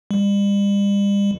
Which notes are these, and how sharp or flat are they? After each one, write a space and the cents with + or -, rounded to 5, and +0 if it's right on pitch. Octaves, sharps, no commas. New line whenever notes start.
G3 +40